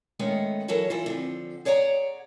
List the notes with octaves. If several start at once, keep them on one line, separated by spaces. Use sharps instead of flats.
D#3 G#3 A3 B3 C#4
E3 F#3 F#4 A4 A#4 C#5
E3 E4 F4
D3 F3 C4
G#4 C#5 D5 F#5 G#5 A#5